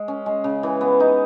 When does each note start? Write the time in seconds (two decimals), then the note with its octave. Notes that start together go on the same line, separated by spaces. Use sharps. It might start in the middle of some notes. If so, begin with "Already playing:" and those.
Already playing: G#3
0.08 C#4
0.26 G#3
0.44 C#3
0.63 E3
0.81 B3
1.00 D#4